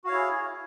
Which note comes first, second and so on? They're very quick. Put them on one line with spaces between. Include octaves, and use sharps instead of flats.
F#4 F5 C#5 E4 G#4